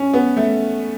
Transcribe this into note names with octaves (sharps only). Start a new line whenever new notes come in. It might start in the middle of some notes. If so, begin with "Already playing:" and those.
Already playing: C#4
B3
A3